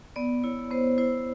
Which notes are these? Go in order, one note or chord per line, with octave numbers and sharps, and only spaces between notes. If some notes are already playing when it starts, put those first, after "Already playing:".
B3 D5
E4 C#5
B3 C5
E4 C5